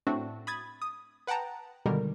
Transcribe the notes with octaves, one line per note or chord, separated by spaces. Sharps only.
A2 A3 C4 D4 F#4
B5 D#6 G#6 A6
D#6
B4 F#5 G5 A5 A#5
B2 D3 D#3 G3 G#3 A#4